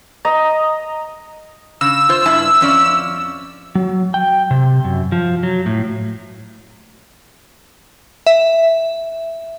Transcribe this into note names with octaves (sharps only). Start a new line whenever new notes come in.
D#5 A#5
C#3 E6
F4 C5
G2 E4 A5
F2 C#4 D5
F#3
G5
C3
F#2
F3
F#3
A2
E5